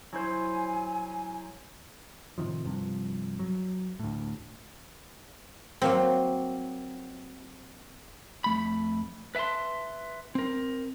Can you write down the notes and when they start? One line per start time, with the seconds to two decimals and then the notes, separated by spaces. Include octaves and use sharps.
0.13 F#3 E4 C5 G#5
2.38 A2 C3 D#3 F3
2.66 G2 C3 F3
3.39 F#3
3.99 D2 A2
5.82 F#3 A#3 C4
8.44 F2 A3 B5
9.35 B4 E5 G#5 A5 C6
10.35 C4 A#4